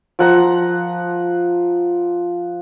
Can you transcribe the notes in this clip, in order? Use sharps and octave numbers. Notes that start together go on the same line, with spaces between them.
F3 F#5 A#5